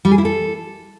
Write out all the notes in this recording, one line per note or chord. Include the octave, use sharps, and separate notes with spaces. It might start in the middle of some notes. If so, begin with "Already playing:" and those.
G3
G#4
E4
A4